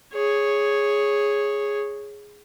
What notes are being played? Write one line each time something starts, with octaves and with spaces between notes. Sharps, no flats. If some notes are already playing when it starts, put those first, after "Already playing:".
G#4 C#5